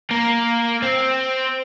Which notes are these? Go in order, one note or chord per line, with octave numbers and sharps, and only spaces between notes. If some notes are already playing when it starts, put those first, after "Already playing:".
A#3
C4